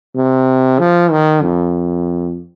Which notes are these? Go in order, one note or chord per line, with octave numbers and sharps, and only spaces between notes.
C3
F3
D#3
F2